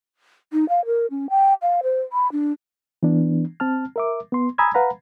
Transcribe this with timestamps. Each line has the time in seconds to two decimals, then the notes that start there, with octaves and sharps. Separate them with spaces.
0.53 D#4
0.69 F5
0.86 A#4
1.11 C#4
1.30 G5
1.62 F5
1.83 C5
2.12 B5
2.32 D4
3.03 E3 B3 D4
3.60 C4 A5 F6
3.96 A#4 E5 D6
4.32 B3 C6
4.58 G#5 A#5 B5 D#6 E6 G#6
4.74 B4 F5 F#5 A#5 B5